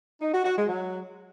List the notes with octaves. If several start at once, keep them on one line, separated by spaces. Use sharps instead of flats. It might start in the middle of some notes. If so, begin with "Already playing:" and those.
D#4
F#4
F#4
G#3
F#3